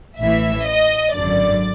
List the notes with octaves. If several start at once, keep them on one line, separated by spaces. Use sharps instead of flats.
A1 A2 E3 E5
D#5
G#1 F#2 D3 D5